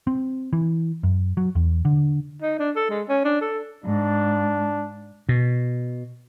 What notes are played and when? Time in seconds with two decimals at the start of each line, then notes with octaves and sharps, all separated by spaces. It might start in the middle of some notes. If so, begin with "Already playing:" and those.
0.07 C4
0.53 E3
1.03 F#2
1.37 F#3
1.55 E2
1.85 D3
2.42 D#4
2.59 D4
2.76 A4
2.90 G#3
3.09 C#4
3.25 D4
3.41 A4
3.84 G#2 D4
5.29 B2